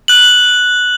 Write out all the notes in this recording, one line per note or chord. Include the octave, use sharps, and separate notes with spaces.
F#6 F#7